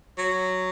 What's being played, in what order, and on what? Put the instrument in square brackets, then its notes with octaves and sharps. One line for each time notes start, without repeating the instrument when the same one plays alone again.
[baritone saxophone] F#3